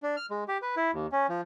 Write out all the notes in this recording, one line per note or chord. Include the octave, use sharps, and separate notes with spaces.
D4
F6
G#3
G4
B4
E4
D#2
C#4
F3